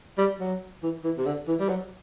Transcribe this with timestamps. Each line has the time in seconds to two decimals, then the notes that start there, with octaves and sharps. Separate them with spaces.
0.18 G3
0.40 F#3
0.83 E3
1.04 E3
1.18 C3
1.26 D3
1.48 E3
1.60 G3
1.69 F#3